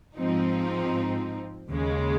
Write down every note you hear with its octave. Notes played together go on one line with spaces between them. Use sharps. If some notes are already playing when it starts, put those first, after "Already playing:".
G#2 F3 C4 D#4
D#2 C#3 G#3